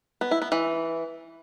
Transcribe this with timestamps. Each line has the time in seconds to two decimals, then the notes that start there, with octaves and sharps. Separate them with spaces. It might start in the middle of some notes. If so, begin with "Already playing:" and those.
0.21 B3
0.31 E4
0.42 B3
0.52 E3